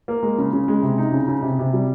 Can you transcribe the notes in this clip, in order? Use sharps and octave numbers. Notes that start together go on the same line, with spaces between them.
A#3
G#3
C#3
C#3
G#3
C3
D#4
C#3
C#3
C3
C3
G3